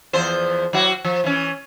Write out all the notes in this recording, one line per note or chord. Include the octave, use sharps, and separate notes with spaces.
E2 F3 C5
F#3 E4 F#4
F3
E3 C#4